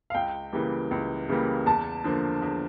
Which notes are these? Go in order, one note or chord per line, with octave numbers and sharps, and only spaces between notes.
F5
C#2 G5
C#3 E3 G3 A#3
C#2
C#3 E3 G3 A#3
E2 A5
D3 F3 A#3
E2